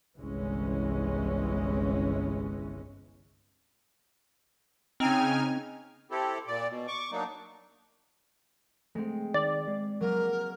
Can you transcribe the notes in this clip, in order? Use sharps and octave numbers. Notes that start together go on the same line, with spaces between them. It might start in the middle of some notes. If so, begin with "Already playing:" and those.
G1 C2 E3 G#3 C#4
C#3 C4 D#4 G5 G#5 F6
C4 E4 G4 A4
A#2 D5
B2
C#6 D6
F#3 A#3 D4 D#4
G#3 A3 C4
D#3 D5
G#3
F#3 A#3 A#4